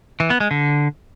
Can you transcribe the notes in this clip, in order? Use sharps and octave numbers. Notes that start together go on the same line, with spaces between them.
E3
B3
G#3
D3